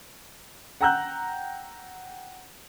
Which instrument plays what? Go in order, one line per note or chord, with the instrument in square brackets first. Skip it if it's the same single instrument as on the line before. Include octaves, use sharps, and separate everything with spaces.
[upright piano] F#5 G5 A#5 E6 F#6 G6